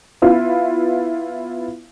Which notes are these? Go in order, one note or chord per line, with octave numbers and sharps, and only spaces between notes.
B3 E4 F4